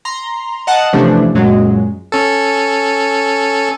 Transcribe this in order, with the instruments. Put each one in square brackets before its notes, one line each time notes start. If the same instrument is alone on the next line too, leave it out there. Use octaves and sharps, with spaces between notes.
[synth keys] A#5 C6
D#5 F5 F#5 A5
C3 E3 F3 A3 C#4 D4
F#2 A#2 F#3 G#3
[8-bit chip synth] C#4 A4